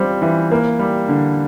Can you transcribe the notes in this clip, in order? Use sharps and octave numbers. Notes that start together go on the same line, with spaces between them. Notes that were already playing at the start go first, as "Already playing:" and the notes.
Already playing: G3 C4 F4
E3
A#3
G3
D3